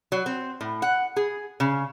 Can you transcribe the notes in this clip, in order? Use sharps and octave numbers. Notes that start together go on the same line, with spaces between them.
F#3
C4
A2
F#5
G#4
C#3